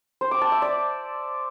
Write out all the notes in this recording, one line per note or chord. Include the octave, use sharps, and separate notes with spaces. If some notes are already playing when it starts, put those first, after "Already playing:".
C5
D6
A5
E5
D5